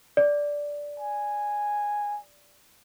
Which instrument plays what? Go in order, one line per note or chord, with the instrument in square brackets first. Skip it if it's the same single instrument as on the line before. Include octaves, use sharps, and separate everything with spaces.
[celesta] D5
[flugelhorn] G#5